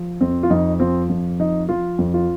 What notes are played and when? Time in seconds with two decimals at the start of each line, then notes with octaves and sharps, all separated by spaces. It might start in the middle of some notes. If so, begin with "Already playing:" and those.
Already playing: F3
0.21 F2 C4
0.43 F4
0.50 F2 D#4
0.80 F3 C4
1.09 F2
1.40 F3 D#4
1.69 F3 F4
1.99 F2
2.14 F4